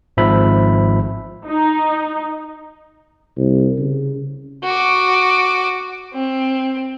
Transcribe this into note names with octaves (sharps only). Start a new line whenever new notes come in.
G#1 G#2 F3 E5 B5
D#4
C2
C#3
F#4 D6
C4